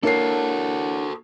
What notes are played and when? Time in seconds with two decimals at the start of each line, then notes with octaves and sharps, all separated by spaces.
0.03 A#3 D4 E4 F#4 A4 C#5 C7